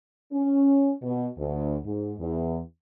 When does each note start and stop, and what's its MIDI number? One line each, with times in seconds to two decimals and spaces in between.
0.33 0.92 61
1.03 1.26 47
1.38 1.75 38
1.84 2.13 44
2.19 2.58 40